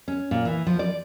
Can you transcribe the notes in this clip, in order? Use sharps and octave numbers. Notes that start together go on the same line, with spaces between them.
C#4
A#2
E3
F3
D5